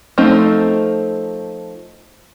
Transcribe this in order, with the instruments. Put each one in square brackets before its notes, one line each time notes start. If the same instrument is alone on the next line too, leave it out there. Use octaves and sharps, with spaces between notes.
[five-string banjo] F3 A3 C4 D#4